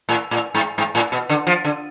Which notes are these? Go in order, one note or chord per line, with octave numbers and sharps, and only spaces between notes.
A2
A2
G#2
G#2
A2
B2
D3
F3
D3